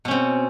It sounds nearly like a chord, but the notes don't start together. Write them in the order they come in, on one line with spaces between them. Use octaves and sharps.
B2 C#4 C4